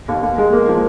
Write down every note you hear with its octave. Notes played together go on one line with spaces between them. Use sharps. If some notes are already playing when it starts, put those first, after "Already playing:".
D#2
D#2
G#3
A#3
F3